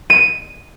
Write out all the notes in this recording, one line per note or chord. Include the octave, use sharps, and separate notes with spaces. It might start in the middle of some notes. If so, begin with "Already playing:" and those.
D#7